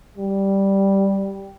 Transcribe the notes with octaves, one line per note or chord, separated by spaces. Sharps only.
G3